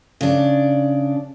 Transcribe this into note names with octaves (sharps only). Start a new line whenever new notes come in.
C#3 D4